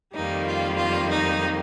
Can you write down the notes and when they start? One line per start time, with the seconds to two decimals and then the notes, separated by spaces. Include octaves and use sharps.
0.14 F2 D#3 G3 A#3 D#4
0.46 F4
0.77 F4
1.10 D#4